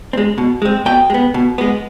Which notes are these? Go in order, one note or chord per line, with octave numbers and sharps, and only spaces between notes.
C4
G#3
B2
G#3 C4
B2 G5
G#3
B3
B2
G#3 B3